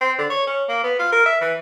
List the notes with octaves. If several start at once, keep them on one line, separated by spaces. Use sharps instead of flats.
C4
D3
C#5
C#4
A#3
B3
F4
A#4
E5
E3